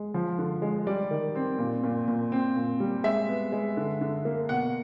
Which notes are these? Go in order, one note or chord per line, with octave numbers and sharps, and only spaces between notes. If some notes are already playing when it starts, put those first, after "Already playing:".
Already playing: G#3
F3
D3
G#3
G3 D5
D#3
C4
A#2
A#2
A#2
C4
A#2
G3
G#3 E5
B3
G#3
D3
D3
A#3
B2 F#5